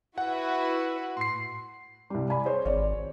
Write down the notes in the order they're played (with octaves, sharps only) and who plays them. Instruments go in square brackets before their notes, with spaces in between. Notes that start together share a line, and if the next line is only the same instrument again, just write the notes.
[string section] E4 F#4 B4 [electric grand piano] F#5
[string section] A2 [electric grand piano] C6 C7
[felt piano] C2 G3
D5 G#5 B5
G#4 C5 C#5
[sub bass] G#1 [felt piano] C#5 D5